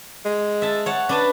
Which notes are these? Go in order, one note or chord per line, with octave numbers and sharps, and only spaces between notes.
G#3
E5 A5
C#5 F#5 A5
D4 B4 A5